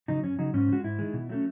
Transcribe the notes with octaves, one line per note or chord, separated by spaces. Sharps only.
C#3 F#3 D#4
F#2 C#4
C#3 F#3 D#4
G#2 C#4
D#3
G#3 F#4
G#2 E4
D#3 G#3
B2
F#3 A3 C#4